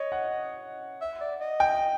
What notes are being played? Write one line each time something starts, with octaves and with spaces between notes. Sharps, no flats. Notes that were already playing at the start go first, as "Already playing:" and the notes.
Already playing: C#5 D#5
F#5
E5
D5
D#5
G5